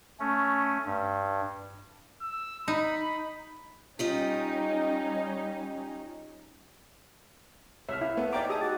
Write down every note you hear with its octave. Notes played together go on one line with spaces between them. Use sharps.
A3 C#4
G2
E6
D#4 B5
G3 C#4 D#4 F4 G4 D#5
C2 C#5 E5 F6
E4 E5 F5
A3 B3
D#4 C#5 D5 E5 G5 A#5 D6
G4 G#4 D#5 A5 D#6 E6
F#4 D6 A6